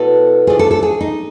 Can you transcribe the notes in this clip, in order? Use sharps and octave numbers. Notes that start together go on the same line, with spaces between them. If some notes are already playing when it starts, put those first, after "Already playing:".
Already playing: B2 F#3 B3 E4 A4
F3 A3 D4 G#4
A4
A4
G#4
D#4